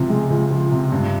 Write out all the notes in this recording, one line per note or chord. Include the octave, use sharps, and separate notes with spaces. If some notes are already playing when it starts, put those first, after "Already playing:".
Already playing: C#2 C3 F3
G#3
C#2
F3
C3
G2